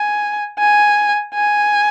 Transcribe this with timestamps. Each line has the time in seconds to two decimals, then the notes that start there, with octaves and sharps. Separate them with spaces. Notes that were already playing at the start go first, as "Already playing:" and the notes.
Already playing: G#5
0.59 G#5
1.34 G#5